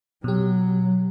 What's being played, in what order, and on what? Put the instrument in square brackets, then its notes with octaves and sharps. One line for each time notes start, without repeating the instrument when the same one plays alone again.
[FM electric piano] B2 G4 [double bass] F#3